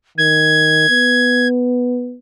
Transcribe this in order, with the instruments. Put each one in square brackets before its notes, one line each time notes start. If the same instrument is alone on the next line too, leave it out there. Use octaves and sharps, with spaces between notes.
[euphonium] D#3 [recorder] G#6
[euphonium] B3